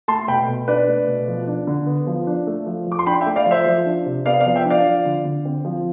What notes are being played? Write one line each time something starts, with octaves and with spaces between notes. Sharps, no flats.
A3 A5 C6
B2 G5 B5
B2
D4 B4 D5
A3
B2
F3
D4
D3
B3
F3
D4
A3
F3
F3
D6
C6
D4 G5 B5
E5 G5
A3
D5 F5
F3
C5 E5
F3
D4
C3
B3 D5 F5
D5 F5
F3
E5 G5
D4
D5 F5
F3
D3
D3
C4
F3